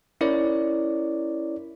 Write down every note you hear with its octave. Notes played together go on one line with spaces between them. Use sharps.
C#4 E4 A#4 C#5 D5